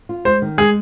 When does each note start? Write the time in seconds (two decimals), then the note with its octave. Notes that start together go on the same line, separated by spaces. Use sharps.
0.09 F4
0.25 G#3 C5
0.42 D#3
0.58 G#3 G#4